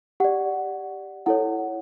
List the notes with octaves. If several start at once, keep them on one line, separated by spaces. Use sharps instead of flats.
G4 D5 F#5
E4 A4 C#5 F#5